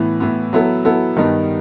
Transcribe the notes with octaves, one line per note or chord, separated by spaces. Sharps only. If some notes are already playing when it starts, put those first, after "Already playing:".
Already playing: A2 E3 B3
A2 E3 B3
F#3 B3 E4 A4
F#3 B3 E4 A4
G2 D#3 G3 B3 D#4